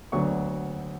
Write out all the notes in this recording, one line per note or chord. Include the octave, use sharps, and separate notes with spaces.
D2 D3 F#3 B3 C#6